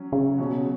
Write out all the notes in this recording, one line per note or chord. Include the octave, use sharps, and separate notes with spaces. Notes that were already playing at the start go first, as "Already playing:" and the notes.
Already playing: F#3 C#4
C#3
B2 F#3 C#4